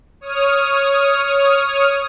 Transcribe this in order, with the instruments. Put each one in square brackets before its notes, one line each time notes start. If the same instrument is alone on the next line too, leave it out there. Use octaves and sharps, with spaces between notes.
[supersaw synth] C#5 D#6 F6